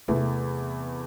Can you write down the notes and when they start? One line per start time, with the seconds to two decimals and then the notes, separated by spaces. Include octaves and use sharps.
0.08 E2 C3 E3 A3